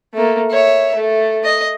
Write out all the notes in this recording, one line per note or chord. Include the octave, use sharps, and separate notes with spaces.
A3 A#3
C#5 E5
A3
D#5